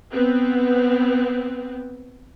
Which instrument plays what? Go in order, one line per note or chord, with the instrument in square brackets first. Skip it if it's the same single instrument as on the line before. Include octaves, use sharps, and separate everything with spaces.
[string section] B3 C4